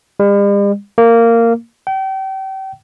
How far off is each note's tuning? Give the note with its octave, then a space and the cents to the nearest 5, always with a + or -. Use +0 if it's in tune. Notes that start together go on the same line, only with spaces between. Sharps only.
G3 +45
A#3 -15
G5 -35